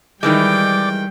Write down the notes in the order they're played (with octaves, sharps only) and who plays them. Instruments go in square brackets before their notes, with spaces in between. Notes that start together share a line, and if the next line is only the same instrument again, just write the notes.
[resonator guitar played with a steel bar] D#3 E3 G#3 [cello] G3 [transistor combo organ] D5 D6 [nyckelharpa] G5